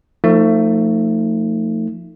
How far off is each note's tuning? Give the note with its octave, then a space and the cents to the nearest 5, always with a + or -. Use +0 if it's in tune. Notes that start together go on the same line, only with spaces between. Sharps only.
F3 +0 A3 +30 D#4 +15